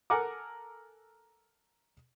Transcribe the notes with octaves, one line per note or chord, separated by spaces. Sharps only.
A4 A#4 F#5 G#5 A#5 D6